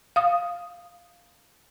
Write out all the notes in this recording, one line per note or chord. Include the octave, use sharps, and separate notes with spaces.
F5 D#6